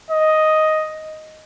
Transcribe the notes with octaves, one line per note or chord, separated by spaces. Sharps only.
D#5